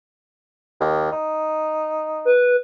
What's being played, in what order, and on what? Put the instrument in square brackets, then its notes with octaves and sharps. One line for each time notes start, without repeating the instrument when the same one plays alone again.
[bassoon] D#2
D#4
[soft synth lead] B4